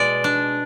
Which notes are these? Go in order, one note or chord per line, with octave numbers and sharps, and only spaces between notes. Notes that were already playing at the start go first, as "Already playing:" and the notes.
Already playing: B2 G#3 D5
D4